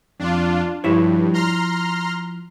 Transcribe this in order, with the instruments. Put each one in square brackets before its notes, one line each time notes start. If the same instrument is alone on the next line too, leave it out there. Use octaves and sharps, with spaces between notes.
[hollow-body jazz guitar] F2 [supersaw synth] D4 F4
[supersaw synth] G2 [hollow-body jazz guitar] F3 E4 C#5
[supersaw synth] A#5 C6 F6